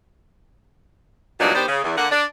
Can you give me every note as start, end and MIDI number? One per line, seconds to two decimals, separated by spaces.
1.40 1.53 40
1.40 1.53 43
1.40 1.53 46
1.40 1.53 54
1.40 1.53 62
1.40 1.53 63
1.54 1.64 51
1.54 1.64 59
1.54 1.64 62
1.54 1.64 67
1.54 1.64 72
1.68 1.80 49
1.84 1.94 40
1.96 2.07 50
1.96 2.07 58
1.96 2.07 78
2.11 2.24 62